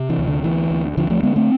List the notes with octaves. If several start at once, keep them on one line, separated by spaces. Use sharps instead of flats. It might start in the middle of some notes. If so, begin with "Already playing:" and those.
Already playing: C3
E3
D2
D3
D2 E3
D2
D2 D3 F3
F3 A3
D3 G#3 B3
A3 C4